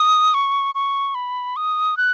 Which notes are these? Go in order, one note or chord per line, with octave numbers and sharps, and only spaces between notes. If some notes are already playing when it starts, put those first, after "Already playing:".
Already playing: D#6
C#6
C#6
B5
D#6
F#6